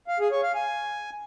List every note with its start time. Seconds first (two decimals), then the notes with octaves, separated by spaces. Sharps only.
0.08 F5
0.20 G#4
0.31 C#5
0.43 F5
0.55 G#5